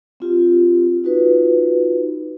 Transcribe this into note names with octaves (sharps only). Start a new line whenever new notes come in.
C4 F4 G4
D#4 F4 F#4 B4